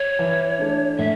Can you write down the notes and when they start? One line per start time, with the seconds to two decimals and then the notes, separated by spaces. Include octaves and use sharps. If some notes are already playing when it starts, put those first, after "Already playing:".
Already playing: C#5
0.19 E3
0.59 A3 D4
0.99 A2 E5